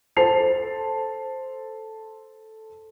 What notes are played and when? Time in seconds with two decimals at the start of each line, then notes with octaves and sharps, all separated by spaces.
0.17 A4 C5 A5 C7 F7